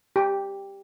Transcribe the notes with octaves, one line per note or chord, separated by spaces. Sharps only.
G4